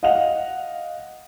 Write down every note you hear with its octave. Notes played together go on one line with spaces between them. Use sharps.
D#5 F5 F#5 F7